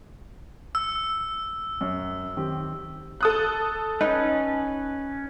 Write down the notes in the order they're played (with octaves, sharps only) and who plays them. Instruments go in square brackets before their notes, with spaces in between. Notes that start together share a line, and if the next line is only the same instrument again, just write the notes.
[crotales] E6
[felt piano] F#2
D#3 C4 G4
[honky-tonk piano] A4 D#6 F#6
[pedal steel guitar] C#4 B4 [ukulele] D#4